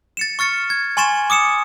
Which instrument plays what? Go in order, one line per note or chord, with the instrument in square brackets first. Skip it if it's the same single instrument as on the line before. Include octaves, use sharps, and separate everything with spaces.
[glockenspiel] A6 C#7 E7
C#6 F6 A6 C#7
G#6
G#5 C6 C#6 A6 E7
D6 D#6 C#7 E7